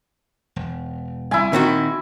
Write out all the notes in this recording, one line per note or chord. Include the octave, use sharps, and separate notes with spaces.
E1
C2 E4 G#5
A#2 D#3 C4 F#4